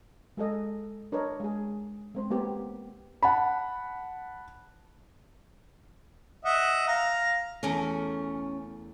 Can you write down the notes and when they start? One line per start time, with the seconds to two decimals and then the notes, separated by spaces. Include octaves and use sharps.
0.37 G#3 G#4 A4 D#5
1.12 D4 A#4 B4 C#5 D#5
1.40 G#3 G#4
2.15 G#3 C4 C5
2.30 A#3 B3 G4
3.23 F#5 A5 B5
6.45 D#5 E5 F#5
6.88 F5 A#5
7.63 E2 A3 C#4 A#4